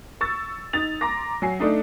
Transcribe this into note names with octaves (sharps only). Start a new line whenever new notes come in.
C#6 E6 A6
D#4 A6 F7
A#5 C6 D6 A#6
F#3 G#5 C7
A3 D4 D#4